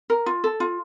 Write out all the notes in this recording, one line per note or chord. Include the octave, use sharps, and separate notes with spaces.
A#4
F4
A4
F4